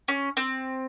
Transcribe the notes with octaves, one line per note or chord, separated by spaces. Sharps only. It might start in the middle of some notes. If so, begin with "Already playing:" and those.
C#4
C4